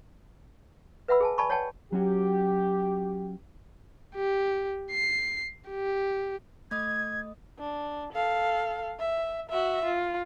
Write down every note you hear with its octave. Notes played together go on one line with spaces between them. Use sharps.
B4 E5 F#5 B5 E6
G#4 G#5 A5
D5 G#5 A5 B5 C#6
C#5 D5 F#5 G5 A5
F#3 C#4 F#4 G4
G4
C7
G4
A3 D#5 D#6 G#6
D4
A4 F5
E5
F#4 E5
F4